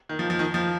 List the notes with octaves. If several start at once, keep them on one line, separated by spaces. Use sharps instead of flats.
D#3
F3
F3
D#3
F3